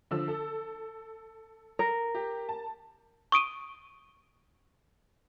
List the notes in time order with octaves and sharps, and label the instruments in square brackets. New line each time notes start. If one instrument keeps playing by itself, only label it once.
[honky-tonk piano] D3 F3 E6
A4
[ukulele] A#4
[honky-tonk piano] G4
A5
[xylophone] C#6 D#6 D7 D#7